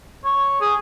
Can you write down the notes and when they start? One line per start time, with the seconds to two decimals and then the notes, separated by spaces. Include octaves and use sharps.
0.24 C#5
0.61 G#4